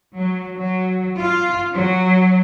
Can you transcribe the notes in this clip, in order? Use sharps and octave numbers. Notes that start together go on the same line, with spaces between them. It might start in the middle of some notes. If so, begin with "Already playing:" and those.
F#3
F#3
F4
F#3